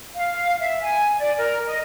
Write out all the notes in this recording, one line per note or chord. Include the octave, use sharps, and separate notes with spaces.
F5
E5
G#5
D5
A#4
D#5